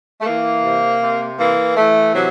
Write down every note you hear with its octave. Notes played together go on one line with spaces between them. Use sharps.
A3
E3 A#3
C3
C3
E3 A#3
E3 A3
C3 F#3